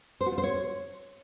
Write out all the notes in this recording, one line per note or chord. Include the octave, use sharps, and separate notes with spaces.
C5
F#4
F4
C5
C#5